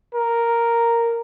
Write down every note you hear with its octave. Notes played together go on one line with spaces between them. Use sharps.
A#4